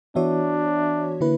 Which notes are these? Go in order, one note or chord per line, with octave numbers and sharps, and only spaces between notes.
E3 B3 D4 F#4 C#5 E5
D3 A#3 E4 B4